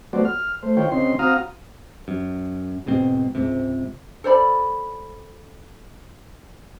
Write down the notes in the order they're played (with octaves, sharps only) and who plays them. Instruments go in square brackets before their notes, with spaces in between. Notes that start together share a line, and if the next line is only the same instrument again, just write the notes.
[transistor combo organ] F#3 A3 B3 F#4 C5 D5
F6
A3 C5
D#3 F4 C5 C#5 G5
C#3 C4 D#4 C6
C4 F#4 F5 A#5 D#6 F6
[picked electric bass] F#2
E1 G#2 B2 C4
C#2 G#2 C3
[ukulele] A4 C5 D5 B5